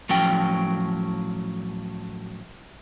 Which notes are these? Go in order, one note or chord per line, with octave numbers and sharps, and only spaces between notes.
A2 F3 F#3 C#4 G5